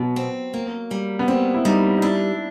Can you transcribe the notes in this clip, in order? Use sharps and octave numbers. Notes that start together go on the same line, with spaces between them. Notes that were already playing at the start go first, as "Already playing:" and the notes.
Already playing: B2 F#3
C4
A#3
G3
B3
A#3 C4
E4
G3 D#4
D#4
D4 E4